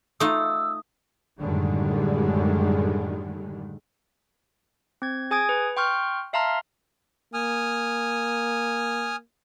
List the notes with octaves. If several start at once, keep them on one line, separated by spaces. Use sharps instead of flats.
A3 D#4 F4 D#6 E6
F#2 A2 D3 D#3 G3 G#3
C4 G#6
G#4 G#5 D#6 G#6 D7
B4
G5 C6 C#6 F6 G6
E5 F5 A5 A#5 C6 F6
A#3 G#5 D#6 F6